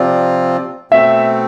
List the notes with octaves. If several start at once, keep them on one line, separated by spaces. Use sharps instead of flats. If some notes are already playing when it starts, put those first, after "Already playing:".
Already playing: C3 F3 C4 F4 D5
B2 A3 C4 E5